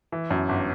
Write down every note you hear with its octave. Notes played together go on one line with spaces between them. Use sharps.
E3
F#2
G1